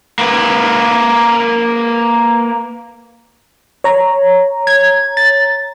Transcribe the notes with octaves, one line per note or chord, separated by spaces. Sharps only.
A#3 B4
C#5 A#5
G#6
A6